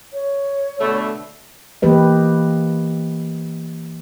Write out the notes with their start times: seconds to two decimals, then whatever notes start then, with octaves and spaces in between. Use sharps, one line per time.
0.13 C#5
0.79 B2 D3 A3
1.82 E3 A#3 G4 B4 D#5